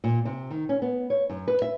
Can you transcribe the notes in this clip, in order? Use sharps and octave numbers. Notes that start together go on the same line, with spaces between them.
A#2
C3
D#3
C#4
B3
C#5
F#2
B4
E5